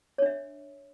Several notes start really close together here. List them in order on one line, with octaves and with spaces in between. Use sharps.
C#5 D4 E5